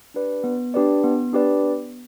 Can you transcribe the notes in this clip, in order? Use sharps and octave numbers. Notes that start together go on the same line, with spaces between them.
D4 G4 B4 D5
B3
D4 G4 B4 D5
B3
D4 G4 B4 D5
B3